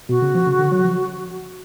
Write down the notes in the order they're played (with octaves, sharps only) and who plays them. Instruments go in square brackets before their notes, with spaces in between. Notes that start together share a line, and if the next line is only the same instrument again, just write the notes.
[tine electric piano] B2 [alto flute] F#4
[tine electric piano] C#3
F3
C#3
D3
F#3
F3